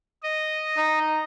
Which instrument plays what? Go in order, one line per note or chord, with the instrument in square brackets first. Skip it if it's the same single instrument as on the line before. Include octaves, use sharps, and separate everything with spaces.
[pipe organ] D#5
[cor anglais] D#4